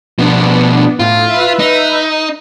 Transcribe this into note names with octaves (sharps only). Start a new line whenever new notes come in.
B2 F3 B3 D4
A2 F4
B4 E5
D#4